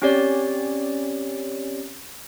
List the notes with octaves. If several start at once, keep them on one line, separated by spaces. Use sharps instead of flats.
C4 C#4 G4 C#5 D5